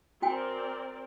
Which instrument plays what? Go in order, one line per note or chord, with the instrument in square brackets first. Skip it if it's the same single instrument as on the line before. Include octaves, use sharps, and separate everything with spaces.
[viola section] C4 A#4 D5 [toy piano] F#4 G5 G#5